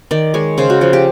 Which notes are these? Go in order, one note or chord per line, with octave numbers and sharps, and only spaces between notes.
D#3 D5
G#3 C#5
C#3 C5
F#4
F3 F#4
G4